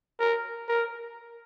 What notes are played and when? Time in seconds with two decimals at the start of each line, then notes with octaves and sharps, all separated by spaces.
0.20 A#4
0.69 A#4